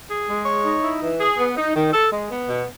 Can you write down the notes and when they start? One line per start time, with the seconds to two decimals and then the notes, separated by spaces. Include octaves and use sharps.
0.09 G#4
0.28 G#3
0.46 C#5
0.65 D#4
0.83 E4
1.02 E3
1.20 G#4
1.38 B3
1.57 D#4
1.76 D#3
1.93 A4
2.12 G#3
2.31 B3
2.49 B2